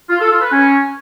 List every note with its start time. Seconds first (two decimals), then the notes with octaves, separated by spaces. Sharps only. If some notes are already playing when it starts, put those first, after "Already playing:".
0.10 F4
0.20 A4
0.31 F4
0.41 B4
0.52 C#4